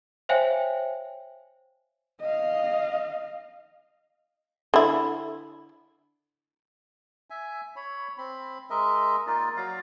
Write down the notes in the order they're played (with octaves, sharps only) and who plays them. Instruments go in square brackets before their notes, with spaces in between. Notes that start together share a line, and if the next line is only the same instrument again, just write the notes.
[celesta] C5 C#5 E5 F5 G5 G#5
[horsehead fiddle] D#5 F5
[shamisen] D3 E4
[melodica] E5 G#5
C#5 B5
C4 B5
G#3 A#4 D#5 E5
A#3 D#4 F4 D5
F#3 D5 F5 A#5